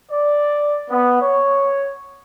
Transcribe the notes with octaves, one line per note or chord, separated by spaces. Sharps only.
D5
B3
C#5